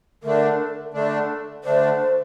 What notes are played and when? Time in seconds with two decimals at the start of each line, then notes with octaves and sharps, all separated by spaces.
0.23 D3 A3 D4 A#4
0.94 D3 A3 D4
1.64 D3 A3 D4 C5